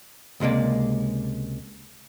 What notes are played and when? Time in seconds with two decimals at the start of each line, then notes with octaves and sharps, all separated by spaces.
0.40 C#2 C3 G#3 A#3 D5